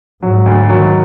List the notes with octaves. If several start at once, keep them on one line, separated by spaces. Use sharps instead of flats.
G#2 F#3
D2
D#3 F#3